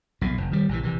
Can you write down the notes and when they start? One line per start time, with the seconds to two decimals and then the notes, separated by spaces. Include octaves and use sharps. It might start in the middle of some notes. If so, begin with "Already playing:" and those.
0.21 B1 A#2
0.38 F1
0.51 D#3 G3
0.69 A#1 C3 E3
0.83 A#1 C3 E3